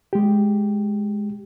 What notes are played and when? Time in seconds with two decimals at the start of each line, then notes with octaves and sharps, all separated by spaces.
0.13 G#3 G4